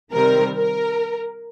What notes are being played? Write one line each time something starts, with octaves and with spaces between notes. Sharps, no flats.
C3 D#3 G3 C4 A#4
A#4